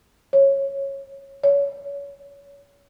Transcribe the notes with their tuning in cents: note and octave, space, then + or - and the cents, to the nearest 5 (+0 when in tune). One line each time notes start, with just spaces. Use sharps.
C#5 -15
C#5 +30